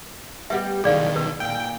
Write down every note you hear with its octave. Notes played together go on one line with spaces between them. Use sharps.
G3 B3 G4 E5
B1 E2 D#3 G#4 D5 F5
B4
A#2 G5